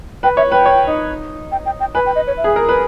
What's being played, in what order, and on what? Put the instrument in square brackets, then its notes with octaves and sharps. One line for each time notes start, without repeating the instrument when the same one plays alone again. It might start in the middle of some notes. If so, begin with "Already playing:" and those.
[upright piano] B4 [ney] G5
[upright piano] C#5 [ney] E5
[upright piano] B4 [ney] G5
[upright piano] C#5
D#4
[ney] G5
G5
G5
[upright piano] B4 [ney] G#5
[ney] G5
D#5
C#5
E5
[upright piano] G#4
A#4
B4